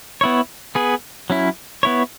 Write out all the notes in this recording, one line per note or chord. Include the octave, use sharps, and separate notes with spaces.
B3 E4 C#5
B3 G#4 B4
F#3 C#4 E4
B3 E4 C#5